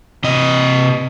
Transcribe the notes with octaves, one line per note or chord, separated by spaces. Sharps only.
C3 D#5